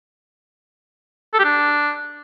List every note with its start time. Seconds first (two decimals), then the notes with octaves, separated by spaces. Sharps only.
1.34 A4
1.39 G4
1.44 D4